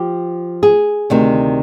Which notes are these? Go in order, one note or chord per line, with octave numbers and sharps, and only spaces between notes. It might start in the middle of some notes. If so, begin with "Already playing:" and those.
Already playing: F3 G4
G#4
D2 C3 D#3